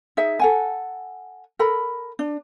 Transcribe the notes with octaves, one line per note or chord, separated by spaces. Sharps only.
D#4 G#4 E5
A4 F#5 G#5
A4 A#4 B5
D4